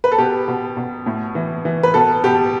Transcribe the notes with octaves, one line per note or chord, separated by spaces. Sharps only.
B4
A4
B2 G4
B2
B2
A2
E3
E3
B4
B2 A4
B2 G4